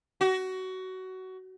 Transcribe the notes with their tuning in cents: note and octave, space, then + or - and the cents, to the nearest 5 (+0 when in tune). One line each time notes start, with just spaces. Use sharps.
F#4 +20